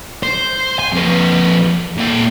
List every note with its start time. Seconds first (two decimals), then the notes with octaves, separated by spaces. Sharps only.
0.23 C5
0.80 G#5
0.93 F2 B4
1.97 A#2 G5